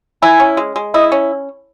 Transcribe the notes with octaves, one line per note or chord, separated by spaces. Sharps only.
E4 G#5
C#4
G#3
G#3
E4 D#5
C#4